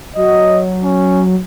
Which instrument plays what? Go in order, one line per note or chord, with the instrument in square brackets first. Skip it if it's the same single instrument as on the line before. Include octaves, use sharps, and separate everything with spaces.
[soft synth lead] F#3 [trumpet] D#5
[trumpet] C#4